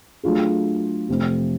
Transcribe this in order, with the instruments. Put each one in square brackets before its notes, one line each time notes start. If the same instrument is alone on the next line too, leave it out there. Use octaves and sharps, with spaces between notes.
[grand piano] F#3 A3 D4 F4 G#4
F2 C3 F3 A3 C4